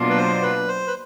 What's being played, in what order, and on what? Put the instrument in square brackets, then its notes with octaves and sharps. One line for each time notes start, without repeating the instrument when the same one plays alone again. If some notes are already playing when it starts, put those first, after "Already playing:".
Already playing: [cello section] B2 F#3 A#3 D4 F4
[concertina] B4
C5
B4
C5
B4